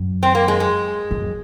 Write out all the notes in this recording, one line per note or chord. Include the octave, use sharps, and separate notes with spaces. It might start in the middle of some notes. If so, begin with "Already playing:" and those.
Already playing: F#2
C4
A#3
G#3
G#3
F#2